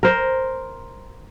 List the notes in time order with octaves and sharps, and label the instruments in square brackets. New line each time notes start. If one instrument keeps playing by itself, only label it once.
[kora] A#4 C5